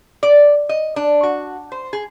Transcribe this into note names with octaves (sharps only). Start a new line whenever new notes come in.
D5
D#5
D4
F#4
C5
G#4